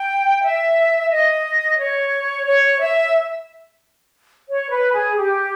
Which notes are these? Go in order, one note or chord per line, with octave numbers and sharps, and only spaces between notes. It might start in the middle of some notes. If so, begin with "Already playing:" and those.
Already playing: G5
E5
D#5
C#5
C#5
E5
C#5
B4
G#4
G4